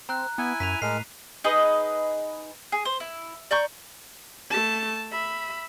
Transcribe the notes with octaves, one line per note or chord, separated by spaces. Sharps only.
C4 A#5 F#6
B3 E4 G#5
F#2 B6 D#7 F7
A2 G#3 A#4 C7
D#4 G#4 B4 D#5
G#4
C5
E4
D5 A#5 C#6 G6
A3 A5
E5 B5